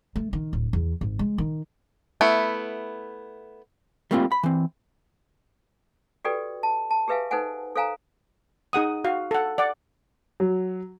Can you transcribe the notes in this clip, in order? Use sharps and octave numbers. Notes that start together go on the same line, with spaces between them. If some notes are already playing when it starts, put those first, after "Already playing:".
A3
D#3
D1
E2
G#1
G#3
D#3
A3 B3 E4
G3 A3 A#3 C4 D#4 F4
B5
E3 C4
F#4 G4 A4 B4 D5 G5
A5
A5
G4 G#4 B4 E5 F5 G#5
D#4 A4 B4 C5 F#5 G#5
A4 C5 F5 G#5 A#5
D#4 G#4 F#5 D#6
F#4 F5
A4 F#5
D5 F#5 D6
F#3